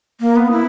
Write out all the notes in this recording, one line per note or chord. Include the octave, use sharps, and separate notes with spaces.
A#3
B3
E4